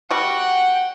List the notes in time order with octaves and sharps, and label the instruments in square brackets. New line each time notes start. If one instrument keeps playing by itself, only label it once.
[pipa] G3 F#4 [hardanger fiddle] F#5 G5